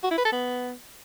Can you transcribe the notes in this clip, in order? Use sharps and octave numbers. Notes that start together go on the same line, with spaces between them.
F#4
E4
B4
A4
B3